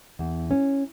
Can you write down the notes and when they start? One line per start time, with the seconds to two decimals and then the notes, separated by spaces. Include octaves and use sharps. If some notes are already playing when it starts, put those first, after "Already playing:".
0.19 E2
0.51 C#4